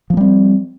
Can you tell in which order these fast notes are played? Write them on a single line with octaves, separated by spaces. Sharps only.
F3 A#3 G3 C4